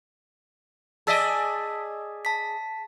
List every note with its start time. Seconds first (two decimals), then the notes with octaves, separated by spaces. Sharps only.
1.07 G#4 D5 D#5 A5 E6 B6
2.25 A5 B6